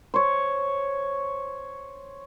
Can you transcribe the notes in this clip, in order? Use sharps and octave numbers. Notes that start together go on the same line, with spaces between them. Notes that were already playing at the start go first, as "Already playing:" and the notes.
C5 C#5